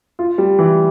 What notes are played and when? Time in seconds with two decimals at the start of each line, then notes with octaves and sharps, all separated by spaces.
0.19 F4
0.38 G3
0.59 E3